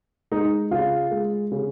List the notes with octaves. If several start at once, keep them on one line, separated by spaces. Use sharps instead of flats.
G#3 D#4
C#3 F4
G#3
C#3